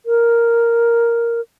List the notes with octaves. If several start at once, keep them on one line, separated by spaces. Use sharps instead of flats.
A#4